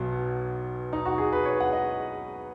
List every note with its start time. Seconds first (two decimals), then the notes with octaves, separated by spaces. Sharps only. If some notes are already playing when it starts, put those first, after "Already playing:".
Already playing: B1 B2 F#3
0.93 D#4
1.05 F#4
1.18 G#4
1.32 B4
1.45 C#5
1.60 F#5
1.73 D#5